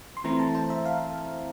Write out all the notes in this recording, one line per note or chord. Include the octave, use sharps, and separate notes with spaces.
C6
E3 A3 C4 E4 A#5
A5
C5
E5
F5